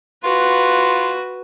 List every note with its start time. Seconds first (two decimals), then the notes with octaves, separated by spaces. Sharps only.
0.24 F4 F#4 B4